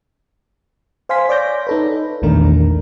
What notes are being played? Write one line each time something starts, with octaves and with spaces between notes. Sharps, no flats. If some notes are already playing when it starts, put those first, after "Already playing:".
C5 F5 G#5 C6 B6
C#5 D5 D6 G6 A#6
D#4 A4 B4
A#1 E2 D#3 A3 D4 A#4